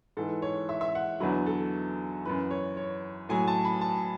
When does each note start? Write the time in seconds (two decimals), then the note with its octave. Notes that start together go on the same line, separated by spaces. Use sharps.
0.17 G#2 E3 A4
0.42 C#5
0.69 E5
0.81 E5
0.95 F#5
1.20 E2 D3 F#3 B4
1.46 A4
2.25 F#2 E3 B4
2.51 C#5
2.77 C#5
3.29 A2 F#3 G#5
3.47 A5
3.65 B5
3.81 A5